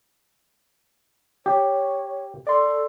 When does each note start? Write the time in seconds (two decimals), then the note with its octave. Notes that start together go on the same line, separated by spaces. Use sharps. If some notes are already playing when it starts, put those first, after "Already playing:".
1.46 G4 C#5
2.47 A4 D5 C6